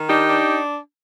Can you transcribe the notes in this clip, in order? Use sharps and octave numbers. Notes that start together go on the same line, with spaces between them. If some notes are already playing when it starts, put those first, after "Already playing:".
Already playing: D#3
D4 D#4 G4
D4